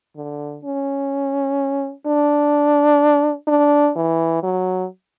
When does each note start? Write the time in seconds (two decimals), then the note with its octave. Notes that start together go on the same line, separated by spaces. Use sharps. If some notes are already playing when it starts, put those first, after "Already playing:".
0.16 D3
0.64 C#4
2.07 D4
3.48 D4
3.96 E3
4.43 F#3